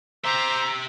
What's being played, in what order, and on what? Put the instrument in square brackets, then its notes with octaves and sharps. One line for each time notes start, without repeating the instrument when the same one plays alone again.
[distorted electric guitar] G4 E5 [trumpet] C5 [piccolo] A#5 [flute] E6